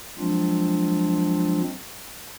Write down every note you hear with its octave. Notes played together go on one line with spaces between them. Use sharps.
F3 F#3 G#3 C4 D4 F4